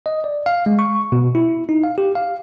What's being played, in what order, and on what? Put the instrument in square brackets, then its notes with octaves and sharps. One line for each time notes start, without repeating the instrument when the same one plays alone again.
[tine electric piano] D#5
D5
F5
G#3
C#6
B2
E4
D#4
F5
G4
F5